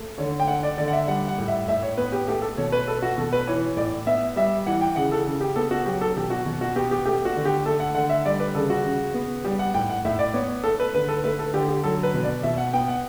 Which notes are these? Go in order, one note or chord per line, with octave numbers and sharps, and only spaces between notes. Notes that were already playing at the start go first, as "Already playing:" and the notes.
Already playing: A3
D3 C#5
G5
A3 F#5
D5
D3 D5
F#5
E5
G3 F#5
F#5
A2
E5
A2 E5
C#5
B3 B4
G4
A3 G4
A4
B2 C#5
B4
A3 A4
F#4
B2 A4
B4
E3 C#5
A2 D5
B3 E5
G3 E5
E3 F#5
G5
C#3 F#5
A4
C#3
G4
B3 A4
F#4
F#3 G4
A4
B2 G4
F#4
B2
F#4
B3 G4
G4
A3 G4
F#4
D3
G4
A3 A4
F#5
D3 F#5
E5
G3 D5
B4
C#3 A4
F#4
C#3
B3
G3 G4
F#5
A2 G5
F#5
A2 E5
D5
B3 C#5
A3 A4
B4
D3 B4
A4
A3 B4
A4
D3 G4
G4
F#3 A4
B4
B2
D5
B2 E5
F#5
B3 G5
F#5